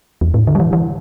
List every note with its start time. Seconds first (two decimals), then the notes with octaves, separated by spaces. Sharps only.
0.21 E2
0.34 A2
0.47 D3
0.55 G3
0.60 E3
0.73 E3